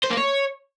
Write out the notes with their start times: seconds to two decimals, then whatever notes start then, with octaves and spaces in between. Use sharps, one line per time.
0.03 C5
0.10 A#3
0.17 C#5